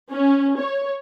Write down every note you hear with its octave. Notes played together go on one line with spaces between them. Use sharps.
C#4
C#5